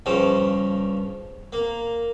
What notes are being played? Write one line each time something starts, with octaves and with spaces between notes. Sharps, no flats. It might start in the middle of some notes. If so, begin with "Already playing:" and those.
G2 C#3 F3
A#3